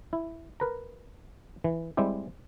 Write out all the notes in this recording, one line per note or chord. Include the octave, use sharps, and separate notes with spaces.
E4
A#4 B4 A#5
E3
G3 G#3 C4 E4 G4